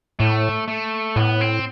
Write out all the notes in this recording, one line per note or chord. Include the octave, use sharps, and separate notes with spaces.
A2 A3
A3
A2 B3
C4